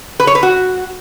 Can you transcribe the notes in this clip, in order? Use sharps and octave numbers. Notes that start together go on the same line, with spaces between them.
B4
C#5
B4
F#4